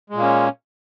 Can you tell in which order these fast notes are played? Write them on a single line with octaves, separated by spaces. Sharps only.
G#3 A#2 A#3 C#4